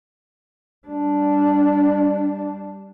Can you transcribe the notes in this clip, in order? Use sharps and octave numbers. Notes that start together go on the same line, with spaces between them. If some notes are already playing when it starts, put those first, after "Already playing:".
G3 D4